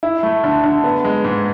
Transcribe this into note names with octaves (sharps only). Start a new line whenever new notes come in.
E4
A3
D3
D3
B3
G#3
G#2